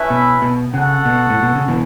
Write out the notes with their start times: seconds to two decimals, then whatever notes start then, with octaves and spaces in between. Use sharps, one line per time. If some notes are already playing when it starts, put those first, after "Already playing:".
Already playing: A3 C#4 E4 B4 E5
0.10 B2
0.42 B2
0.73 C#3 F#4 A4 F#5
1.06 B2
1.30 A2
1.43 B2
1.55 C#3
1.68 B2 E3